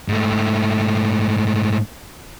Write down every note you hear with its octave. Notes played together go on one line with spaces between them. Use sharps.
G#2 A3